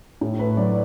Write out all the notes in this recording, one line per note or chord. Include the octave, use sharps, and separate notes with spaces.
A2
A3 B4
F#3 D5